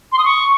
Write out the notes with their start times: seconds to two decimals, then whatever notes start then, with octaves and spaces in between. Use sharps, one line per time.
0.12 C6
0.18 D#6
0.25 C#6